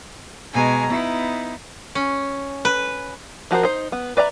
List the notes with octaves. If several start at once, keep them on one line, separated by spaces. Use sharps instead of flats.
B2 G#3 G#5 A#5
B3 D#4 E4
C#4
B4
F3 F#4 A#4 C5
D#4 C5
B3
B4 D5 E5 A#5